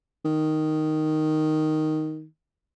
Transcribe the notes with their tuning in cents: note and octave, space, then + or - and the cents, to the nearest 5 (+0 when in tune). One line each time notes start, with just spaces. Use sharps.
D#3 +0